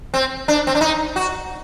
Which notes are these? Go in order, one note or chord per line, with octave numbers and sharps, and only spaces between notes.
C4
D4
C4
D4
D#4
F#4